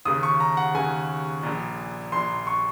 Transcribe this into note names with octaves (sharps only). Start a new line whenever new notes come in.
D#2 C#3 D#6
C#6
A#5
F#5
D#2 C#3 G#5
A#1 A#2
A#1 A#2 C6
C#6